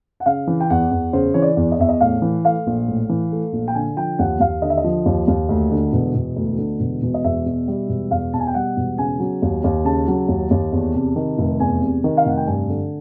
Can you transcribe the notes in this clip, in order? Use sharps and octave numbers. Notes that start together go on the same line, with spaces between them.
F#5
C#3 F5
E3
G5
E2 F#5
E2
C#3 C5
E3 C#5
D5
E2
D#5
E2 E5
D#5
A2 F5
E3
A3 F5
A#1
A2
E3
A3
A#1
G5
D3 G#5
F3 G5
D#2 F#5
D#2 F5
D3 D#5
E5
D#5
F3
D#2
D#2
D2
D3
E1
E1
D2
D3
E1
E1
D#5
E2 E5
B2
G3
E1
E2 F5
B2 A5
G#5
G5
G3 F#5
E1
C#3 G#5
F#3
D#2
D#2
C#3 A5
F#3
D#2
D#2
E2
C3
D#3
F1
E2 G#5
C3
D#3
F5
F1 F#5
G5
G2 G#5
D3